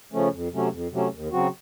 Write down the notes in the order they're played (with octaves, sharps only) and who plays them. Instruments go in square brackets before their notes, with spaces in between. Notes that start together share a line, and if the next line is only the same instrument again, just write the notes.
[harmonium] C#3 F3 A3 C#4
F2
C3 F#3 A3 C#4
F2
C3 F#3 A3 C#4
D#2
C#3 F#3 C4 F#4